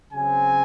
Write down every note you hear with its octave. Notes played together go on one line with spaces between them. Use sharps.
C#3 F#3 C4 G#5